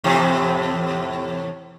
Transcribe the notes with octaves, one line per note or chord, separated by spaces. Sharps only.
E2 A2 C3